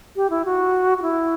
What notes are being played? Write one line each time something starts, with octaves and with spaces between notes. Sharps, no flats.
G4
E4
F#4
F#4
E4